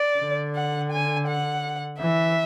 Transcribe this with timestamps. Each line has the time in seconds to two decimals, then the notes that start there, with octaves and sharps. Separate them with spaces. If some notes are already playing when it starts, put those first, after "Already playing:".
Already playing: D5
0.19 D3
0.55 F#5
0.91 G#5
1.28 F#5
2.00 E3 E5